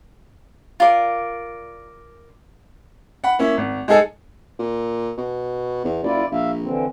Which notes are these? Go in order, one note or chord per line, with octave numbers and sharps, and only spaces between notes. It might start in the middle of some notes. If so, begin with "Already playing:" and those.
F4 A#4 D5
F#5 B5
A#3 C#4 E4
G#1
G#3 D#4 G#4 A4 G#5 C#7
A#2
B2
E2
F#1 E4 F4 D5
A#1 E5 F5
D3 E3 C4